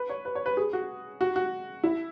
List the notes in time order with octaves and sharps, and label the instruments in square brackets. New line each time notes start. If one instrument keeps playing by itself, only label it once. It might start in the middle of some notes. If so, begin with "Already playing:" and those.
Already playing: [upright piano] B4
C#5
B4
C#5
B4
G#4
F#4
F#4
F#4
E4